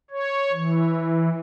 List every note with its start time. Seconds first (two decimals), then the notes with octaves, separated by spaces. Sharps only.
0.10 C#5
0.52 E3